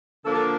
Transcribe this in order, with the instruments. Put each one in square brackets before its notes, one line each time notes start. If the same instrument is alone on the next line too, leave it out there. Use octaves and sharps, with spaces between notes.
[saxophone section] D3 F3 A#3 D4 A4
A4